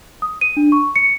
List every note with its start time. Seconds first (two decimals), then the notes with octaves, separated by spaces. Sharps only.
0.22 D#6
0.41 D#7
0.57 D4
0.72 C#6
0.96 C#7